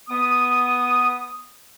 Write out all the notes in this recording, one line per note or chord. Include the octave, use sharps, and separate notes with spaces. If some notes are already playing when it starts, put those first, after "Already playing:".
B3 D#6